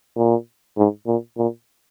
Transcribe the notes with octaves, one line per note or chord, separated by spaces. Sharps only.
A#2
G#2
A#2
A#2